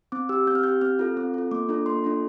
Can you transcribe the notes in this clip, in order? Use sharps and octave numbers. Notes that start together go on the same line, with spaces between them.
C4 D6
G4 E6
C4 G6
F6
G4 G6
C4 F6
F4 A4
C4
F4 A4
A#3 D6
D4 F4 A4
A#3 C6
D4 F4 A4